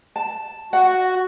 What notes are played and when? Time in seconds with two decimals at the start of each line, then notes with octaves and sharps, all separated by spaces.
0.16 A5
0.73 F#4 F#5